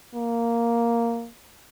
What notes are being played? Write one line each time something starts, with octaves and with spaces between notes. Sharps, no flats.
A#3